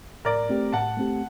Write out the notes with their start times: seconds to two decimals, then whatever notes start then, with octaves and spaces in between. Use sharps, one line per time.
0.25 A2 A#4 D5
0.49 A3 C4 G4
0.73 A2 F#5 A5
0.97 A3 C4 G4